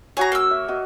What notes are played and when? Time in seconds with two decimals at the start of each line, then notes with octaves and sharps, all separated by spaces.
0.17 F#4 G#4 C#5 A#5
0.32 A#3 E6
0.51 E5
0.68 F#4 D#5